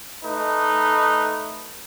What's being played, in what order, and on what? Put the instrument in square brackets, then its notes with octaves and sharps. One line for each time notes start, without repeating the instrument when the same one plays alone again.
[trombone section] A3 D#4 B4